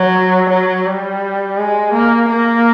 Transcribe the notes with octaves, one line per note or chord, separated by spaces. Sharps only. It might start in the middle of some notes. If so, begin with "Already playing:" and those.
Already playing: F#3
F#3
G3
G#3
A#3
A#3